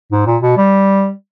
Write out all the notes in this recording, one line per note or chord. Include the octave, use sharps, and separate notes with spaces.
G#2
A#2
B2
G3